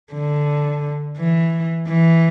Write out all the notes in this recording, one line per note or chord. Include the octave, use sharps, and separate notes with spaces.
D3
E3
E3